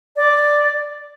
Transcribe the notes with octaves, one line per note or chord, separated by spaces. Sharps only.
D5